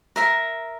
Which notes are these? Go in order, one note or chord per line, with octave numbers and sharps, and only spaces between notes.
A#4 E5 A#5